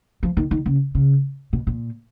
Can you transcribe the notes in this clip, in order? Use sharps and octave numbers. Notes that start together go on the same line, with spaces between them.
F3
D#3
D#3
C#3
C#3
B2
A#2